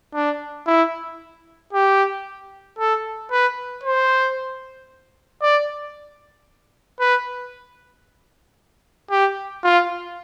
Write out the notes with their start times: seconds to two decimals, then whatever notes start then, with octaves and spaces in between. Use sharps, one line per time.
0.14 D4
0.67 E4
1.73 G4
2.79 A4
3.31 B4
3.83 C5
5.42 D5
7.00 B4
9.11 G4
9.64 F4